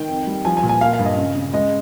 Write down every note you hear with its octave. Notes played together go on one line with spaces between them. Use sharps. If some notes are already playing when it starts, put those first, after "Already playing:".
Already playing: D#3 G5
F2
G3
F3 G#5
G#5
A#2
G#5
A#3 F5
F5
G2
D#5
C#3
C#3
G#3 D#5